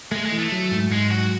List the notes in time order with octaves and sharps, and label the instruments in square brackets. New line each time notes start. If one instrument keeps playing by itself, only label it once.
[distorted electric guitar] G#3 [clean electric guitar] A3
[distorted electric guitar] G#3
[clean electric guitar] E3
[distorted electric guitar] A3
[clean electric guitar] F#3
G#2
[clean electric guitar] G#2 [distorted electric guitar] G#3
[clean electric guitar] F#3 [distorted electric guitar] F#4